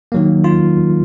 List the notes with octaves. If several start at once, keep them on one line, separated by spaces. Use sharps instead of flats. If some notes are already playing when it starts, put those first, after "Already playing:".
D#3 F#3 A#3
F4